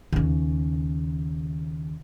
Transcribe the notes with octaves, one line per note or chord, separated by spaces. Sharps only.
D#2 C#3